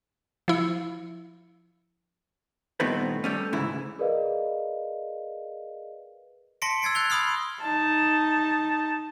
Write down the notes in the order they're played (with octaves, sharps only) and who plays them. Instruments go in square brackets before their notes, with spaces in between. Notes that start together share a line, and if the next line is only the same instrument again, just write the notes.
[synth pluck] F3 E4 C#7
[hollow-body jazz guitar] G2 A#2 D#3 A3 B3 C4
G3 A3 C#4
D2 G#2 C#3 E3 E4
[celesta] G#4 A#4 B4 D5 D#5 F5
[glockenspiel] A5 C6 A#6 B6 C#7 D7
E6 G#6 A6 C7 D7
F#6 G#6 A6 F7 G7
B5 C6 D#6 F6 C7
[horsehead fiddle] D#4 A5